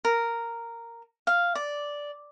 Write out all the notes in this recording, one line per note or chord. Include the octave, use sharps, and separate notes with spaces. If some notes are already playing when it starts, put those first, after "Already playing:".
A#4
F5
D5